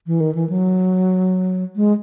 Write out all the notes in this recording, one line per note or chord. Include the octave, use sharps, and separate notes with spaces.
E3
D#3
E3
F#3
G#3